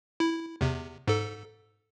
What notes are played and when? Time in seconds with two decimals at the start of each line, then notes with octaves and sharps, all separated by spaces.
0.20 E4
0.61 E2 C3
1.08 G#2 A4